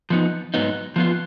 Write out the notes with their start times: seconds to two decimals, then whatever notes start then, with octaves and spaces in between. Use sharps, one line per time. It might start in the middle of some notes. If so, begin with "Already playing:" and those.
0.10 F3 B3 D#4
0.54 G#2 F#3 B3 D#4
0.96 F3 B3 F4